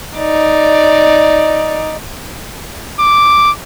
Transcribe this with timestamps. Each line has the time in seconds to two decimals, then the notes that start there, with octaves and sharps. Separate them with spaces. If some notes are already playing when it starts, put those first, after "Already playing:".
0.18 D#4 D5
3.00 D6